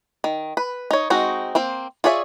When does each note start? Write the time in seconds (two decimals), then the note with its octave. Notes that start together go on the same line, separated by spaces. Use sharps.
0.24 D#3
0.57 B4
0.91 D#4 C#5
1.10 G#3 C4 D#4 F#4
1.55 A#3 C4 C5
2.04 F4 G#4 C#5 D5 E5